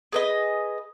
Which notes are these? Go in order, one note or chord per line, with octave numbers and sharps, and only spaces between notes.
G#4 B4 D#5